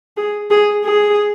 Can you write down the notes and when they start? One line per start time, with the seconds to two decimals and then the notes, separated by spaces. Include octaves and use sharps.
0.17 G#4
0.50 G#4
0.84 G#4